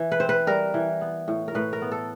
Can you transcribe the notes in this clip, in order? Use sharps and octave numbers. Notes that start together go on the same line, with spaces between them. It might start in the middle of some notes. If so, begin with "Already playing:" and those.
Already playing: E3
B4
C4 C5
B4
G3 A#4
E3
B3
A2
A#4
A2 B4
A#4
B3
A4